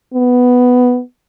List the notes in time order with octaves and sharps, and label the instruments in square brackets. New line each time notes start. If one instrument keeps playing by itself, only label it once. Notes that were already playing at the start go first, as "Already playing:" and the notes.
[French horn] B3